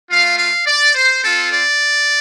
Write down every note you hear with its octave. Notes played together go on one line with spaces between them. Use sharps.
A3 F4 F5
F5
D5
C5
C4 F4 A4
D5